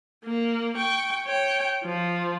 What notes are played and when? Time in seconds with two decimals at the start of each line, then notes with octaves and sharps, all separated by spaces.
0.24 A#3
0.76 G5 C#6
1.26 C#5 G5
1.84 F3